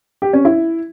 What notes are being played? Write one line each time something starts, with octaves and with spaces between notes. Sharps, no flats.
G4
C#4
E4